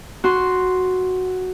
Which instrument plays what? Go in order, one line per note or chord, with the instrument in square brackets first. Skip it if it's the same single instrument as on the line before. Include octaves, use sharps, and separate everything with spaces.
[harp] F#4 C6